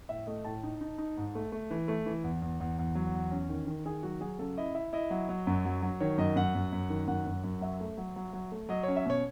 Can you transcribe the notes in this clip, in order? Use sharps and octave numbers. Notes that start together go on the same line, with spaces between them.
A2 E5
A3 D#5
A2 A5
D#4
D#4
D#4
G#2
A3
A3
E3
A3
E3
E2
E2
E2
E2
F#3
E2
C#4
D#3
D#3
D#3 G#4
F#3 F#4
F#3 G#4
C#3 A4
E4 D#5
E4 E5
E4 D#5
F#3
F#3
F#2
F#3
F#3
D#3 C#5
F#2 D#5
F#2 F#5
F#2
F#2
D#3
F#2 F#5
F#2
F#2
F#3 E5
A3
F#3
F#3
F#3
A3
F#3 D#5
C#4 C#5
E5
B2 C#5